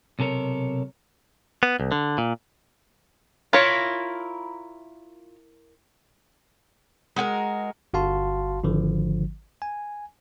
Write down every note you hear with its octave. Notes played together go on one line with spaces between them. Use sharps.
B1 C3 A4 A#4 C#5
B3
C2
D3
A#2
E4 F4 A#4 C#5
G#3 F#4 G4 A#4
G1 F#4 F5 A5 C6
G#1 D3 F3
G#5